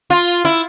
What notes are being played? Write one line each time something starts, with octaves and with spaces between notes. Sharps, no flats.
F4
E4